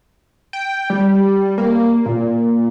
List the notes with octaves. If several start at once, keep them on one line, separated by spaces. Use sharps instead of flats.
G5
G3
A#3
A#2